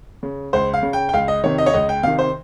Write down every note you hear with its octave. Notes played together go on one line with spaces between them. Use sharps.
C#3
C#2 C5
F5
C#3
G5
G5
C#2 F5
D#5
C3 D#3 C#5
D#5
C#5
C#2 D#5
G5
C3 D#3 F5
C5